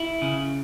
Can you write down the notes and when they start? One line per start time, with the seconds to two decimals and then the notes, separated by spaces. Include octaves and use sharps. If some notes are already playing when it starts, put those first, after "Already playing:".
Already playing: E4
0.22 C#3